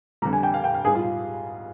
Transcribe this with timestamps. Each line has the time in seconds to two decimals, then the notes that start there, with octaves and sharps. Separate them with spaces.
0.22 F2 D3 G3 A#5
0.33 G#5
0.43 G5
0.54 F5
0.64 G5
0.74 F5
0.85 G#2 G3 G#4
0.95 F4